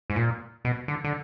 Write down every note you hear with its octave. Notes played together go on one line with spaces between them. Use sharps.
G#2
A#2
B2
D3
D3